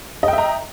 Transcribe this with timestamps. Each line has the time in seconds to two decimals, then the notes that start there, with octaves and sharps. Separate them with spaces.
0.23 D#5
0.28 G5
0.33 E5
0.38 A#5